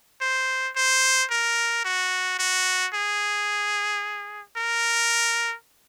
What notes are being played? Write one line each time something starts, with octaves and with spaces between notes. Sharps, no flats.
C5
C5
A#4
F#4
F#4
G#4
A#4